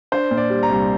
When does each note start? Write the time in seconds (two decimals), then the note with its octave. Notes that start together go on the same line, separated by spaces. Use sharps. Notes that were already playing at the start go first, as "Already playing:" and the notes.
0.12 D4 C5
0.31 A#2
0.37 D5
0.50 G3
0.63 A#5
0.69 C2